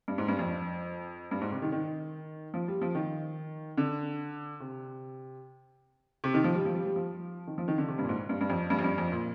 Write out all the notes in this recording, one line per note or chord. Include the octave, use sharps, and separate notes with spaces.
G2
G#2
G2
F2
G2
G#2
C3
D#3
D#3
F3
G3
F3
D#3
D3
C3
C3
D#3
F3
G3
F3
G3
G3
F3
D#3
F3
D#3
D3
C3
G2
A#2
G#2
G2
G2
F2
G2
F2
G2
F2
A#2